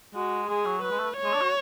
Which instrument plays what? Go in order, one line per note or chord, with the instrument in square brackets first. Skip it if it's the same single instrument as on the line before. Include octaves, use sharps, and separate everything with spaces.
[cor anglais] G#3 [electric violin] F#4
[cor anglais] G#3 [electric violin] G#4
[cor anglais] F#3
[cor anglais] F#3 [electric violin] B4
[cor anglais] G#3
A3
[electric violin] C#5
[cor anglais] G#3
D4
F#4